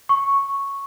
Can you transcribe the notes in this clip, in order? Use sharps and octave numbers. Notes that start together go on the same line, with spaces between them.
C#6